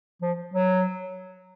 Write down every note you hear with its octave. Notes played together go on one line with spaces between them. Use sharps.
F3
F#3